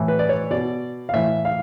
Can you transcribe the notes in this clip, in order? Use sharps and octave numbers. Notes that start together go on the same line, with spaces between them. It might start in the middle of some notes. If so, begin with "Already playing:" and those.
Already playing: A2 E3
B4
D5
C#5
B2 D5
F5
A2 E3 E5
F5